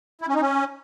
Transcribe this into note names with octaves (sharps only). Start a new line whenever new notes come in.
E4
C#4
D#4
C#4